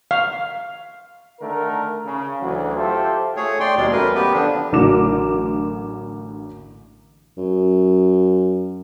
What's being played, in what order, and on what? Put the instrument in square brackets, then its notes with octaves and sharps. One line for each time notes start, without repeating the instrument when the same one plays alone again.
[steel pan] F5
[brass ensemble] D3 D#3 A3 A#4
C#3
D2 E3 F#3
F4 G4 A4 C5 E5
[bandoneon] A3 G#4 C#5
D5 G5 C6
D#2 B2 F#3 G#3 D5
F#2 F#3 A3 A#4 B4
B3 G4 B4
D3 F3 D4
[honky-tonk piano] A1 D3 F#3 A#4 D6 E7
[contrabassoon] F#2